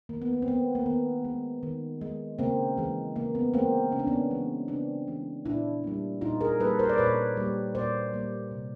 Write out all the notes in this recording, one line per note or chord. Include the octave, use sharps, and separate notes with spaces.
D#3 A#3
B3
A#3
C4
G#3 B3
A#3
D#3 B3
G#3
D#3
G#3
C#3 A#3 C4
E3 G#3
C#3 A#3
B3
E3 G#3 A#3 C4
C#3 C#4
D4
B3 C#4
E3 G#3
C#3 C4 D4
E3 G#3
A#2 D4 E4
G3 A#3
A#2 D#4 F4
G#4 A#4
G3 A#3 A4 B4
A#4 C5
D5
A#2 B4 C#5
G3 A#3
A#2 C5 D5
G3 A#3
C3